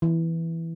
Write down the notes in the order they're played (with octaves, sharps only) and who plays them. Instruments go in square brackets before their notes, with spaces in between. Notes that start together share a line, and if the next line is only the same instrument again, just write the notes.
[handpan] E3